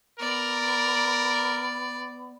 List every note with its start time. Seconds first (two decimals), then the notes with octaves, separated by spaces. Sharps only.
0.20 B3 A#4 D5